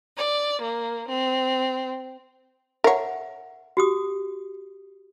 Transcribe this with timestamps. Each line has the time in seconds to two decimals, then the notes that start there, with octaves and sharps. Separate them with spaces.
0.17 D5
0.62 A#3
1.08 C4
2.84 A#4 C#5 E5 F#5
3.77 F#4 G4 D#6